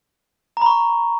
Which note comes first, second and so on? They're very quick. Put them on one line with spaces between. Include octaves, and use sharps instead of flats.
A#5 B5 C#6